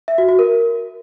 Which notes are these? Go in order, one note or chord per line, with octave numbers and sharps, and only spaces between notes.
E5
F#4
F#4
A#4